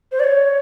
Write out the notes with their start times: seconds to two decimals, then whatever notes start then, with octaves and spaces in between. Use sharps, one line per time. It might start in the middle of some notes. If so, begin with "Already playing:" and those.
0.12 C5
0.20 D5
0.24 C#5